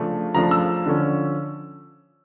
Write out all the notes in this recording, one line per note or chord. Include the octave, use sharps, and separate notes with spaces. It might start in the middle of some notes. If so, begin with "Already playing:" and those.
Already playing: C#3 F3 A3 D4
C#3 F3 A3 D4 A#5
E6
D3 F3 C#4